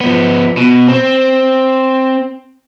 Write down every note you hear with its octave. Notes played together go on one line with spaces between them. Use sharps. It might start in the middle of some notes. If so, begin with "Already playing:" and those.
F3 B3
B2
C4